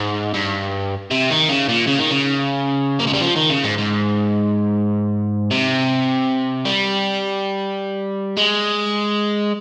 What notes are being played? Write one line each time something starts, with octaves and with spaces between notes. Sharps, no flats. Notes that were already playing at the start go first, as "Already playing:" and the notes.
Already playing: G#2
G2
C3
D#3
C#3
A#2
C#3
D#3
C#3
A#3
G#3
G3
F3
D#3
C#3
G#2
G#2
C3
G3
G#3